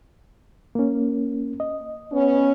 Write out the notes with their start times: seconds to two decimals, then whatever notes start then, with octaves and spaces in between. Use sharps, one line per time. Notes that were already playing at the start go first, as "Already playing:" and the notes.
0.75 A#3 C#4
1.60 D#5
2.12 B3 C#4